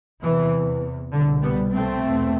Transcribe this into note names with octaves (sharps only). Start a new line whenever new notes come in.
E2 C3 E3
C2 B2 D3
G3 B3
A3 C4
E2 B2